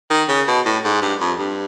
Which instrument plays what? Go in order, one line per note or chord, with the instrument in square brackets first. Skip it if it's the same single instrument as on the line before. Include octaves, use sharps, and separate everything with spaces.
[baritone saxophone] D#3
C#3
B2
A2
G#2
G2
F2
G2